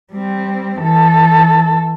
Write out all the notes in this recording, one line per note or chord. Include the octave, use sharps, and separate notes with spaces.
G3 C4
E3 A4